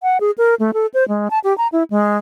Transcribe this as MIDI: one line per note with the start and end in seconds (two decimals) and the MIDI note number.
0.03 0.18 78
0.20 0.31 68
0.38 0.55 70
0.59 0.71 57
0.74 0.86 69
0.94 1.07 72
1.08 1.28 56
1.30 1.39 81
1.44 1.56 67
1.58 1.67 82
1.72 1.83 64
1.90 2.17 56